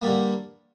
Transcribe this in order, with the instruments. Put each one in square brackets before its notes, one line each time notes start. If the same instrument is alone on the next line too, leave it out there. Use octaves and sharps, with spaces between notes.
[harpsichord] G2 D3 G3 A#3